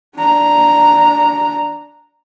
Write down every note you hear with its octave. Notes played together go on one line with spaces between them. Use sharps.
D4 A#5